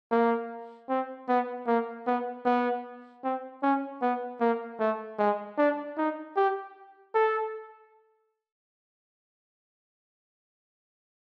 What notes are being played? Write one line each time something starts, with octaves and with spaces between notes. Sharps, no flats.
A#3
C4
B3
A#3
B3
B3
C4
C#4
B3
A#3
A3
G#3
D4
D#4
G4
A4